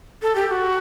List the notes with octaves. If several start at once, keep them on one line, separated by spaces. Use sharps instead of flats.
A4
G4
G4
F#4